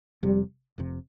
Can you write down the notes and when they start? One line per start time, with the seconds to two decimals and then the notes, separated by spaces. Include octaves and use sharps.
0.23 F1 F2 C3 G3
0.78 F1 F2 C3